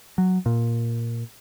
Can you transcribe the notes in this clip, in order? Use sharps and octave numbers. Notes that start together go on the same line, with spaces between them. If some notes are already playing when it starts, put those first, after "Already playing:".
F#3
A#2